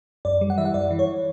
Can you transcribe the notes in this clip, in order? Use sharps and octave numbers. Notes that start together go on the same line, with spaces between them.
F#2 D5
G3
F#5
E3 E5
F#5
F#2 D5
E3
C#5